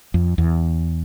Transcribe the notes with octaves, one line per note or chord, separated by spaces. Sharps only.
F2
E2